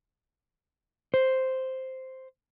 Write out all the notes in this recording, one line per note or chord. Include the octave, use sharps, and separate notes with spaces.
C5